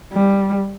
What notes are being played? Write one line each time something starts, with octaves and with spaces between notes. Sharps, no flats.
G3